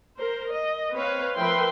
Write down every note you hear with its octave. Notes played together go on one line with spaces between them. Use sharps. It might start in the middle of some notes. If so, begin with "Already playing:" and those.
A#4 C5
D#5
C4 B4 C#5 F5
F3 A#4 B4 E5 G5 C6